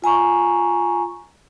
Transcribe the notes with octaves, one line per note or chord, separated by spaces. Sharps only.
F4 G#5 A#5 C#6